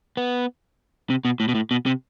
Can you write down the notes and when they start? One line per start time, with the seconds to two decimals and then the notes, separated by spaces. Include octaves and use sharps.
0.17 B3
1.10 C3
1.25 B2
1.40 A2
1.49 B2
1.55 A2
1.71 B2
1.86 C3